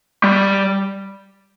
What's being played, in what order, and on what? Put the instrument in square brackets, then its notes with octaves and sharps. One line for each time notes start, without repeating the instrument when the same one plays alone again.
[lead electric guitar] G3